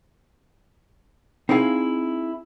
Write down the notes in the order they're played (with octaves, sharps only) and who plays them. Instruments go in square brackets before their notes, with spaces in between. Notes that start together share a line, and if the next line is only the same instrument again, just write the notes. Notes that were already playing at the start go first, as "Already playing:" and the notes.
[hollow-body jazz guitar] C4 D#4 E4 G#4 F5